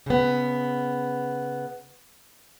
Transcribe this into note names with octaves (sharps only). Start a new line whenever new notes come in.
C#3 B3